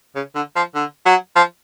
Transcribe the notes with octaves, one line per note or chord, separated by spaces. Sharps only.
C#3
D3
F3
D3
F#3
F3